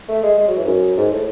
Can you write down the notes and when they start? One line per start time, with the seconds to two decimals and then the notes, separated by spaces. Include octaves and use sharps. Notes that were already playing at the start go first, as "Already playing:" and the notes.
0.09 A3
0.23 G#3
0.38 G#3
0.47 F#3
0.57 E3
0.63 G#2
0.66 F#2
0.97 G#2
1.11 A2